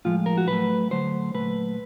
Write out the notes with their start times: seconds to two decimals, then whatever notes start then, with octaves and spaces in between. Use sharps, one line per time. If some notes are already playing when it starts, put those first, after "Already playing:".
0.05 A2 F3 G#3 F4
0.26 A#4
0.38 F#4
0.48 A2 F#3 A3 B4
0.91 D3 F#3 A3 C5
1.34 A#2 F#3 A3 B4